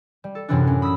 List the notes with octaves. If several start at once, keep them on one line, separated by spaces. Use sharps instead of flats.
G3
A4
F#2 A2 C3 E3 B3 D4
C#4
B5 D#6 E6 B6